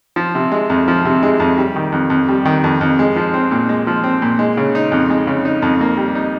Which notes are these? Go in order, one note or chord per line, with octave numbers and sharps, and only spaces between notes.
F3
C3
G#3
F2
F3
C3
G#3
F2
G3
D#3
F2
F2
G3
D#3
F2
F2
G#3
F3
C4
A#2
G#3
F3
C4
A#2
G#3
C#3
D#4
F2
G#3
C#3
D#4
F2
A#3
G3
D#4